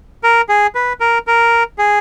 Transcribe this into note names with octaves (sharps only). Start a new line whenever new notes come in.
A#4
G#4
B4
A#4
A#4
G#4